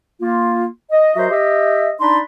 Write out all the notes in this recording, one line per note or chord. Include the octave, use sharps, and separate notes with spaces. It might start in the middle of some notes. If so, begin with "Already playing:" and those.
A#3 F4
D#5
F#3 F#4 A#4 C5 D#5 E5
G4 D#5 E5
D4 D#4 D5 B5 C6